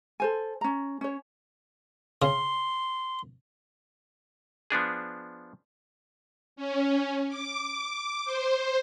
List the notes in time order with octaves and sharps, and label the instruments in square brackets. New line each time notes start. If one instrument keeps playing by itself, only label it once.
[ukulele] A4 C5 G#5
C#4 A#5
C#4 C#5
[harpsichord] C#3 [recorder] C6
[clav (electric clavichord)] F3 B3 D4 G#4
[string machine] C#4
D6
C5